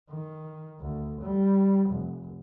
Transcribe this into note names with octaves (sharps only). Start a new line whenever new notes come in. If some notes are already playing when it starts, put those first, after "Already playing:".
D#3
D2
G3
F1